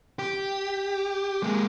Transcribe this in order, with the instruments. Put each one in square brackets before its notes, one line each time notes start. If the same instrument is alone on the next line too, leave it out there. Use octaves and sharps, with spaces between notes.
[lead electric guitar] G4
G#3 A#3